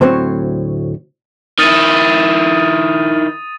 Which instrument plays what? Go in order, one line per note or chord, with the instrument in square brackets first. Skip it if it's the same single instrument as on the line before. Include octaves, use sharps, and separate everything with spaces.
[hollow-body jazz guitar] D2 A2 F#3 C4 C5 C#5
[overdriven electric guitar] D#3 E4 [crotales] D#6 A6 D#7